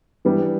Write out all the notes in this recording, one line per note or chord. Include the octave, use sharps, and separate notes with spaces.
E3 G3 B3 D4